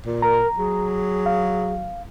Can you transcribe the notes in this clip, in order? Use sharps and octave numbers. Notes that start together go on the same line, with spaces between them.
A#2
A#4 A#5
F#3 G#4
F5